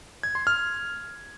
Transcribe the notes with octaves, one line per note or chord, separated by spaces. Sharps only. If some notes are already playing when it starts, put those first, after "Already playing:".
G#6
C6
F6